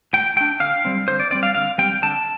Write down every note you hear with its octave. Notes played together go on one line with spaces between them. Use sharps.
A2 G5
A3 D4 G5
D3 F5
G3 C4
D3 C5
D5
G3 C4 D5
F5
D3 F5
G3 C4 G5
D3 A5